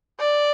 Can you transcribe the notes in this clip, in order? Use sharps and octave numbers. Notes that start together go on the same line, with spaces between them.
D5